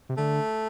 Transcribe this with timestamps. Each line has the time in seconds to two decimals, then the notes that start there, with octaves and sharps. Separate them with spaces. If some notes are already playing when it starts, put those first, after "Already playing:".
0.09 C3
0.17 D3 A3